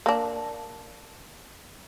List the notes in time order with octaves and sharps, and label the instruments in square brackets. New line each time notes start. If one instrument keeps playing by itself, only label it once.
[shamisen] A#3 D4